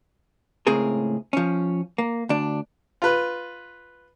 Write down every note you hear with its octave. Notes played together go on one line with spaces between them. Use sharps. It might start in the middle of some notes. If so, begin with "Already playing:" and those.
C#2 A2 C4 G#4 A#4
F3 C#4
A#3
D2 D4
F4 B4